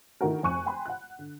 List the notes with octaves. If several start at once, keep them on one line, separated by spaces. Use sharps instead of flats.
D3 D#3 A3 E4 F#4 A#4
F1 F2 G#5 C#6 F#6 D#7
G5 G#5 B5 C6
F#5 F#6
D3